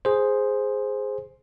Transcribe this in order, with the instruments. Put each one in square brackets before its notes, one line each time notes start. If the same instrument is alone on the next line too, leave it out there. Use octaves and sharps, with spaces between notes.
[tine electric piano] G#4 C5